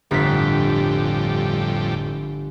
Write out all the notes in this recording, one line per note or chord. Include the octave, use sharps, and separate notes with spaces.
G1 F2 A2 G3 B6